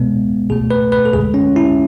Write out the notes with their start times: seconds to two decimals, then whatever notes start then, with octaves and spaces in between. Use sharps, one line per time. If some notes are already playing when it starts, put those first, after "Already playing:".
Already playing: B2 G#3 B3
0.50 B2 A3 G#4
0.71 B4
0.92 B4
1.05 A4
1.13 F#2 D3 G#3 G#4
1.34 C#4
1.56 E4